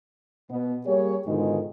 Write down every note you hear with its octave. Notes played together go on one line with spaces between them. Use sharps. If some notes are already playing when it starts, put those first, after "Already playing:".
B2 B3
G3 A#3 G4 G#4 C#5
G#2 B2 D3 D#3 G#3 F4